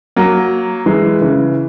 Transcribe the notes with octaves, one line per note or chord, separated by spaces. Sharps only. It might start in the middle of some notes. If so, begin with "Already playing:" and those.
F#3 A#3
E3 G#3
C#3 E3